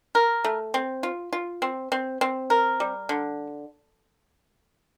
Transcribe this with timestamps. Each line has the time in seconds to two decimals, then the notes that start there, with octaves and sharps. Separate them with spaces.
0.15 A#4
0.44 A3
0.74 C4
1.03 F4
1.33 F4
1.62 C4
1.92 C4
2.21 C4
2.50 A#4
2.80 G3
3.09 D3